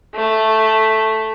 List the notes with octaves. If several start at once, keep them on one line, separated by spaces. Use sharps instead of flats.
A3